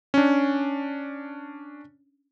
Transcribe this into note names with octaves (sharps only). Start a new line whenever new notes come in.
C#4 D4